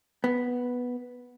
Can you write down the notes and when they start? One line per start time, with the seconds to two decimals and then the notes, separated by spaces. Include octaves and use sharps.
0.24 B3